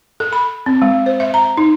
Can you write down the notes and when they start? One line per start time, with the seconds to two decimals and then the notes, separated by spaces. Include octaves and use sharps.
0.20 A4
0.33 B5
0.66 C4
0.82 G#3
1.06 C5
1.20 E5
1.34 A#5
1.57 D#4